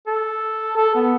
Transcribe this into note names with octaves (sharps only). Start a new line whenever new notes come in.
A4
A4
B3